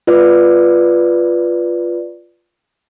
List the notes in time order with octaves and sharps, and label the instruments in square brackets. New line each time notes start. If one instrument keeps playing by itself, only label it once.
[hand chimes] F4 B4 D5